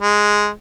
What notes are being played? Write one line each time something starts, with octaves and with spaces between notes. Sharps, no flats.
G#3